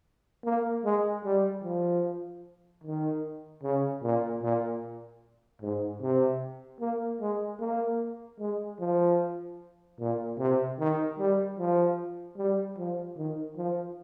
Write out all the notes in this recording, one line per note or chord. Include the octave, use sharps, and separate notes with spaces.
A#3
G#3
G3
F3
D#3
C#3
A#2
A#2
G#2
C3
A#3
G#3
A#3
G#3
F3
A#2
C3
D#3
G3
F3
G3
F3
D#3
F3